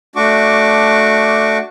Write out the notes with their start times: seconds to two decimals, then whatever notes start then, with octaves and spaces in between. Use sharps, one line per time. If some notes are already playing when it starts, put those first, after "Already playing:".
0.16 A3 D4 F#4 C#6 D6